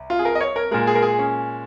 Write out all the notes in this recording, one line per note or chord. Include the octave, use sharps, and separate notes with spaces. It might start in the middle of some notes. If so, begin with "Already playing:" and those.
Already playing: C2
F4
G#4
A#4
D#5
C#5
A#4
A#2 G#3 A#4
G#4
A#4
G#4
C#4